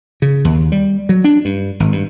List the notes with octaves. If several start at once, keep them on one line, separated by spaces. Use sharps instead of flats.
C#3
D#2
G3
F#3
D4
G2
G#1
G2